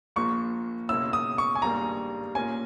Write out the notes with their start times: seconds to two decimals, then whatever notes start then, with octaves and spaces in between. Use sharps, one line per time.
0.16 A#1 A#2 A#3 C#6
0.89 C#2 B2 A#3 C#4 E4 E6
1.13 D#6
1.38 C#6
1.55 G#5
1.62 G#1 G2 G3 A#3 A#5
2.35 A#2 A#3 C#4 G#5